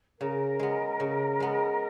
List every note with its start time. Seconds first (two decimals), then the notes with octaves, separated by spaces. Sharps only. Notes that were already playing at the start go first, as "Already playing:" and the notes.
0.20 C#3 A#4
0.59 G#3 B3
1.00 C#3
1.40 G#3 B3